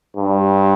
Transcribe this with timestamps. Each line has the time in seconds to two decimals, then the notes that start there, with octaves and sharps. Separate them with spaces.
0.17 G2